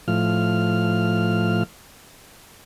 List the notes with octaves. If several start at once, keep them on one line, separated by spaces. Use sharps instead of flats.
A2 F3 F6